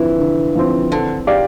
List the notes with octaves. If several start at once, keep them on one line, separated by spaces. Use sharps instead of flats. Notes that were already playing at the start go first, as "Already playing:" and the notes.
Already playing: D3 E3 F3 C4
D3
F3 C4
D3 C4
G4 D5 F5